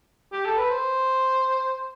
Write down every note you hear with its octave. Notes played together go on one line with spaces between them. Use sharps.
G4
A4
B4
C5